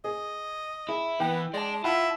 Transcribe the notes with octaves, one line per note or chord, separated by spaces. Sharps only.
G#4 D#5
E4 G#4
E3 B3 G5
G#3 D5 A5
E4 F4 F#5 A5